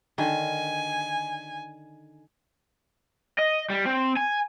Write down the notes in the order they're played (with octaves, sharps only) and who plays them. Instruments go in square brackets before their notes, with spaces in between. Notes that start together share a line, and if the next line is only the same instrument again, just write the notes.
[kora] D3 D#3 [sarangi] G#5
[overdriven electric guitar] D#5
G3
C4
G#5